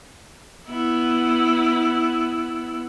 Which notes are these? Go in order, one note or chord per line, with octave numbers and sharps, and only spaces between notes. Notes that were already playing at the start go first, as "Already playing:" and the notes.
B3 E4